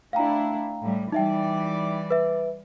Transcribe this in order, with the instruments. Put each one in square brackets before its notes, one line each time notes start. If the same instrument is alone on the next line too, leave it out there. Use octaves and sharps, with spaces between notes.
[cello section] A3 D4 E4 [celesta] F5 G5 A#5
[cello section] A2 G3
[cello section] E3 G3 D5 [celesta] D#4 E5 G5
[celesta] B4 E5